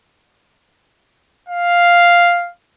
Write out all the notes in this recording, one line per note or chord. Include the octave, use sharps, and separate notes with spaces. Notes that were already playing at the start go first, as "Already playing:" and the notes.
F5